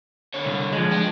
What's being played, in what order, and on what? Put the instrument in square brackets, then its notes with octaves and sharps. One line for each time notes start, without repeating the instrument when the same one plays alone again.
[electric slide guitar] D3 C#5
[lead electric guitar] C2
F3 G#3
[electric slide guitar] D4 G5